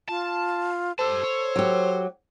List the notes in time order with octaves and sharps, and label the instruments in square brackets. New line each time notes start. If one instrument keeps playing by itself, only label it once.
[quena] F4 [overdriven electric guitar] A5
[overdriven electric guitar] G4 A5 [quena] A4 [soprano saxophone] C5
[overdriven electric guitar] C#5
[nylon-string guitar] F#3 G4